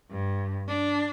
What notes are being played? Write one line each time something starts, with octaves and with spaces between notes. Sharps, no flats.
G2
D4